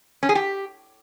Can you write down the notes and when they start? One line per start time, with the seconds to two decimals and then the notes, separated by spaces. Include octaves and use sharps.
0.23 C#4
0.29 G#4
0.35 G4